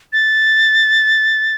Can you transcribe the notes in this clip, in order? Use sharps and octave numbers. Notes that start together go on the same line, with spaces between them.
A6